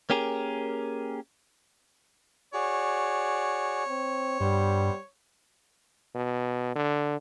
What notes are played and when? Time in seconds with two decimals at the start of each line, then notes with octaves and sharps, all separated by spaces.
0.10 A#3 C#4 G4 G#4 A#4
2.54 F#4 G#4 C#5 D5
3.89 C4
4.40 G2 G3 B3 C5
6.15 B2
6.75 D3